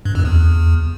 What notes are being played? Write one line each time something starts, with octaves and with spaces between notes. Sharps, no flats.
G2
F2
E2